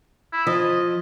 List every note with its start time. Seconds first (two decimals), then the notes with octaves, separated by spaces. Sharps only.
0.32 E4
0.47 F3 D#5